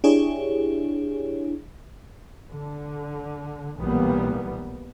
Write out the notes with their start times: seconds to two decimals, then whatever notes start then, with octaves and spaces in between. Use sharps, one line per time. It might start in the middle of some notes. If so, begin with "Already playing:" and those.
0.04 D4 E4 G4 G#4 C#5
2.50 D3
3.79 B1 A#2 E3 G3 A#3 B3